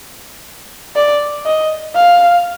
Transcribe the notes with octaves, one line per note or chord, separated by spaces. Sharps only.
D5
D#5
F5